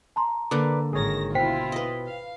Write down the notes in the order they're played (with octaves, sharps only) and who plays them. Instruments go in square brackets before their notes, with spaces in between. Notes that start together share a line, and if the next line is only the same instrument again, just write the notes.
[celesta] A5 A#5 C6
[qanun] D3 A#3 [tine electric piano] B4 D5 D6
[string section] G#1 D#3 A#6 [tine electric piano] G#4 C#5
[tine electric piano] B2 B6 [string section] E4 F4 [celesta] C5 G5
[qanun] B4 D#5
[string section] F5